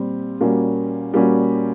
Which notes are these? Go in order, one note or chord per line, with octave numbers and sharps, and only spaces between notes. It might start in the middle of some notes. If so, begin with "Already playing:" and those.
Already playing: A#2 G3 C4
A#2 G3 A#3 C#4 F#4
A#2 G3 A#3 C#4 F#4